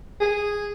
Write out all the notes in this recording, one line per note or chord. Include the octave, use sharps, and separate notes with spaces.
G#4